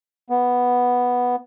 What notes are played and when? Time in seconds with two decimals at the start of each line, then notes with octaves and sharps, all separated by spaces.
0.30 B3